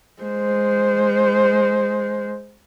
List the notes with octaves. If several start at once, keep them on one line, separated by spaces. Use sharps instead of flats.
G#3 C5